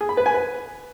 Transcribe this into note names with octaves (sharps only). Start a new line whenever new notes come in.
G#4
B5
B4
G#5
B4